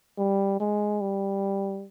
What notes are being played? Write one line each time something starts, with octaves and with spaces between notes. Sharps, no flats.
G3
G#3
G3